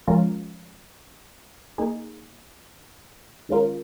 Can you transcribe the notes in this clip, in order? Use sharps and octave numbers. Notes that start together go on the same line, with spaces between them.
F3 G#3 C#4 F4 A#4
A#3 D#4 G#4
D#3 G#3 C#4 F4 A#4